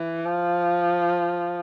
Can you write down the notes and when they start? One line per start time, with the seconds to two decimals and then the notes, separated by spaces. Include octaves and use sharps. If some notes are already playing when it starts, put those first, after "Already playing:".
Already playing: E3
0.25 F3